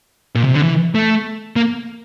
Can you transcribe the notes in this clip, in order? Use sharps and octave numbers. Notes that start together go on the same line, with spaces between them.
A#2
C3
D3
E3
A3
A#3